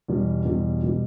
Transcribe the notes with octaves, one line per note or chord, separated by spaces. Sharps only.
E2 B2 G3
E2 B2 G3
B2 G3